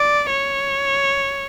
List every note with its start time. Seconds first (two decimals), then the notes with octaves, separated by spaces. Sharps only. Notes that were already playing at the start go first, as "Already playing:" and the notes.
Already playing: D5
0.29 C#5